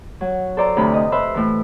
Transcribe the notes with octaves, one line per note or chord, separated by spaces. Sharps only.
F#3
A4 C5 D5 A#5
D2 C3 B5
D#5
B4 C5 E5
A2 E3